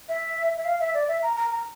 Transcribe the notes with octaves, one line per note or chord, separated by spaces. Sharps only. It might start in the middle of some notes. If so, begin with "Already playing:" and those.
E5
E5
F5
E5
D5
E5
A#5
A#5
A#5